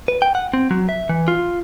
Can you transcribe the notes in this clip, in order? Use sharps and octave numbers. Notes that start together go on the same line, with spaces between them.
B4
G5
F#5
C4
F#3
E5
E3
F4